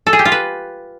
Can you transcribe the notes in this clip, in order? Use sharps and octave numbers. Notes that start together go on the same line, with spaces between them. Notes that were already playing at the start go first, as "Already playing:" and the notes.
A4
G#4
G4
F4
B4